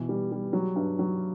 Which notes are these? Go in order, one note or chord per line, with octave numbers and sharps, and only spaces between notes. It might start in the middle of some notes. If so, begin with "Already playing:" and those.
Already playing: B2 E3
G3
G3
F#3
G2
F#3